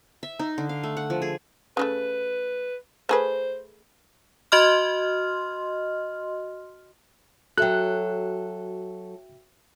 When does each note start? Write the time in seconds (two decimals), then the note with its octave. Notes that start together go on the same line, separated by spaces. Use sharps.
0.23 E5
0.39 D#4
0.58 D3
0.69 F5
0.83 A3
0.97 F#5
1.10 F3
1.22 G#4
1.77 C#3 F3 A3 B4
3.09 A3 G#4 B4 C5
4.52 F#4 D#5 C6 F6
7.58 F#3 F#4 A4 E5 G5 F#6